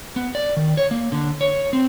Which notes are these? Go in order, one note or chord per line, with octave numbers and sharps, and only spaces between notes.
B3
D5
D#3
C#5
A#3
D3
C#5
C4